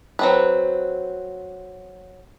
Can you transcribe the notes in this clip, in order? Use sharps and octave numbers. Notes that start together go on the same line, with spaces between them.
F#3 C4 B4